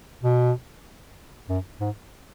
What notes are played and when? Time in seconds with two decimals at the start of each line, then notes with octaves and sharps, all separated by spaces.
0.23 B2
1.49 F#2
1.80 G#2